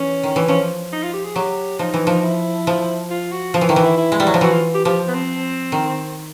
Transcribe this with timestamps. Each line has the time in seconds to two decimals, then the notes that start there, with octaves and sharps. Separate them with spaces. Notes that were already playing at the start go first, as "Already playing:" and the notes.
Already playing: E3 C#4
0.23 D#3
0.36 E3
0.48 F3 C#4
0.92 D#4
1.03 F4
1.13 G4
1.25 G#4
1.35 F#3 G4
1.79 F3 D#4
1.94 E3
2.07 F3
2.23 E4
2.67 F3
3.10 F4
3.32 F#4
3.54 F3 F4
3.61 E3
3.68 D#3 E4
3.76 E3
3.83 E4
3.97 E4
4.12 G#3
4.20 G3
4.27 F#3
4.34 F3
4.41 E3 F#4
4.52 F4
4.74 G4
4.85 F3 G4
5.08 B3
5.14 C4
5.72 D#3